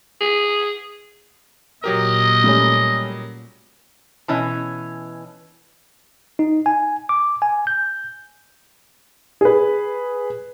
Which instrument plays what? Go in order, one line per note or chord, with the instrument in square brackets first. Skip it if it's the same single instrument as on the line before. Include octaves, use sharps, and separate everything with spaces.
[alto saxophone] G#4
[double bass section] A#2 [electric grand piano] F#3 G4 A#4 [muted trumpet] D#5
[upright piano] G3 A3 C#4
[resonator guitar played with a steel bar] B2 E3 C#4
[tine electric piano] D#4
G#5
D6
G#5
G6
[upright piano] G#4 B4